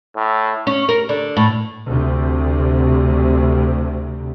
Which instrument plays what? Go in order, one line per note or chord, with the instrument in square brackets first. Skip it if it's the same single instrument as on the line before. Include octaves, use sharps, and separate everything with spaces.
[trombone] A2
[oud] C#4
A#4
D3
A2
[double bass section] D2 C3